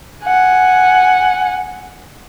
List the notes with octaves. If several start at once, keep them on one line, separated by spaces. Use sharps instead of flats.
F#5 G#5